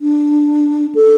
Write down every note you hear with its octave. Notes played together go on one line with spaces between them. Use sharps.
D4
A4